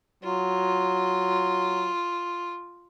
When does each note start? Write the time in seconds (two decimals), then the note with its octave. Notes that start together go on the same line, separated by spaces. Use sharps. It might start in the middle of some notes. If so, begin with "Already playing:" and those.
0.23 F#3 F4